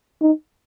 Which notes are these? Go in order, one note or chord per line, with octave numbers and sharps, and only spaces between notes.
D#4